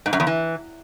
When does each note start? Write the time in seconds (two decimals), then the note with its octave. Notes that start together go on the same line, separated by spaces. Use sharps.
0.06 G#2
0.13 F#2
0.20 E2
0.27 E3